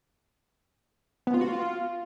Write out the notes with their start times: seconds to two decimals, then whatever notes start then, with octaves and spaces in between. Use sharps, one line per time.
1.27 B3
1.34 F4
1.41 F#4
1.48 F4